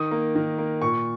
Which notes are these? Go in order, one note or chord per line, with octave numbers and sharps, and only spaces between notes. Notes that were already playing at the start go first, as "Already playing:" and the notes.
Already playing: D#3 D#6
A#3
D#3
A#3
A#2 C#6